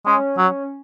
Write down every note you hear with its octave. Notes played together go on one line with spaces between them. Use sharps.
G#3 C#4
F#3